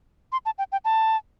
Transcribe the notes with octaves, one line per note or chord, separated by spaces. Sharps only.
C6
A5
G5
G5
A5